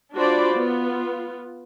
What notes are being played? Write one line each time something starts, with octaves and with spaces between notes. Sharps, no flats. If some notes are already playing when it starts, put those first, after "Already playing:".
D4 F4 F#4 C5 D5 B5
B3 F4